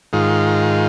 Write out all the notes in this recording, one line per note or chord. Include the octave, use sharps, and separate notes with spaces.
G#2 D#3 F4